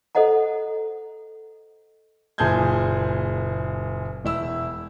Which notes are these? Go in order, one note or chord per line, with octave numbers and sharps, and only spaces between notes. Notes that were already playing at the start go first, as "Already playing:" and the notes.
A4 C5 D#5 F#5 A#5
F#1 A#2 G#4 A5 G6 G#6
E1 E4 E6